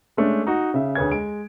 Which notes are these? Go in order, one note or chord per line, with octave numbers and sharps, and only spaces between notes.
G#3 A3 C#4 D4
D#4 F#4
C#3 E5
D2 G#4 B4 C#5 G#6
G#3 D7